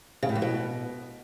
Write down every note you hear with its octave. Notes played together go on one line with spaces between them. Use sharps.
C#3
A2
F2
B2